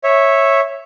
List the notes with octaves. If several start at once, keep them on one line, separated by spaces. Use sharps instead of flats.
C#5 E5